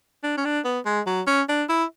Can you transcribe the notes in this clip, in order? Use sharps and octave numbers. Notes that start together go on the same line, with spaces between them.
D4
C#4
D4
B3
G#3
F#3
C#4
D4
E4